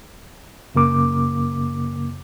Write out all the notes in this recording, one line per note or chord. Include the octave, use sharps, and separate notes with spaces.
F#2 C#3 A#3 D6